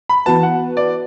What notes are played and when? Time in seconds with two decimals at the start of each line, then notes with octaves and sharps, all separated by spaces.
0.09 B5
0.26 E3 B3 F#4 B4 A5
0.43 F#5
0.77 D5